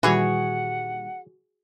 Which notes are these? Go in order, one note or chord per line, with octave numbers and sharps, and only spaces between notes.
A#2 D#3 E3 G3 F#4 G#4 C#5 F#5